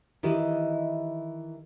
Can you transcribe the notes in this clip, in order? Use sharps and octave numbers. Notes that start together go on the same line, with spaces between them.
D#3 E3 E4 G4 D#5